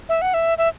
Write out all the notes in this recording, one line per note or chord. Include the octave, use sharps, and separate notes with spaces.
E5
F#5
E5
E5